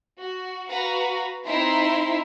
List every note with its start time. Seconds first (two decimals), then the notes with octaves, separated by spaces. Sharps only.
0.17 F#4
0.68 F#4 B4 F5 A#5
1.44 C4 D#4 E4 E5 A#5 C6